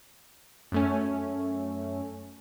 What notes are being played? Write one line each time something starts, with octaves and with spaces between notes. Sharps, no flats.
F#2 A3 C#4